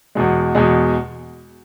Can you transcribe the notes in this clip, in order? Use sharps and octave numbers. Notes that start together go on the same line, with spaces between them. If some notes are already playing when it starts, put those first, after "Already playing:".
E2 B2 G#3
E2 B2 G#3